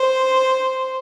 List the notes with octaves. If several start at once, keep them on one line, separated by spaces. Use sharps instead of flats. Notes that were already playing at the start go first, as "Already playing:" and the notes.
Already playing: C5